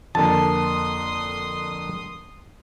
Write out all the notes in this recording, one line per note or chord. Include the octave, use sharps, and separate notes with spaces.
F2 D3 A#3 A5 C6 D#6